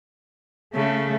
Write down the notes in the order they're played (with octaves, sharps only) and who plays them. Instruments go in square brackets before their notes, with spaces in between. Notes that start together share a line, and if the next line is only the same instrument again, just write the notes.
[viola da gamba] C#3 [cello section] A3